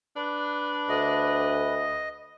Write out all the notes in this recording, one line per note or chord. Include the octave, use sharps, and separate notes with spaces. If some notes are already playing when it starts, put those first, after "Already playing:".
D4 B4
D2 D#5